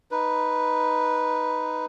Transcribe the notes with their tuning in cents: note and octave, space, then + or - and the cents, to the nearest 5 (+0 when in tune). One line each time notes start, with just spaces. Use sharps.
D#4 +0 B4 +0